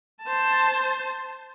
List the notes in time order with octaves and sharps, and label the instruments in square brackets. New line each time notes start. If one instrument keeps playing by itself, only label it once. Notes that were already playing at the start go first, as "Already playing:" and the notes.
[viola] C5 A5